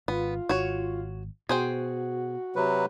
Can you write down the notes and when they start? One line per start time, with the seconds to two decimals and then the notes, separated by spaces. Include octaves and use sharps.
0.08 G#1 B3 F4
0.49 G#1 F#4 C#5
1.49 B2 F#4 G#4 C5 G5
2.55 C3 F#3 B4